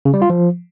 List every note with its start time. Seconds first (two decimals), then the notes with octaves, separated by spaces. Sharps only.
0.05 C#3
0.14 G3
0.22 F4
0.30 F3